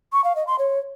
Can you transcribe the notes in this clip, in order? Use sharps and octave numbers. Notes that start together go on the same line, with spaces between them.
C#6
F5
D#5
C6
C#5